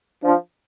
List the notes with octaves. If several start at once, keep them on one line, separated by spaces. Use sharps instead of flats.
F3 D4